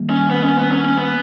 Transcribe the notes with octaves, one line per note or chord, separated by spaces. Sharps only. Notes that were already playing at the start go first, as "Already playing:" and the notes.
Already playing: D#3 G3 A#3
C#4
B3
C#4
B3
C#4
C#4
B3